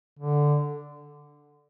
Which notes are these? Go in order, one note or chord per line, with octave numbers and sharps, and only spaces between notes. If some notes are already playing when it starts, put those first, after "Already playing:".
D3